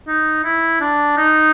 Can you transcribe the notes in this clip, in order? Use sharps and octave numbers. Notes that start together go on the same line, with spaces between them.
D#4
E4
D4
D#4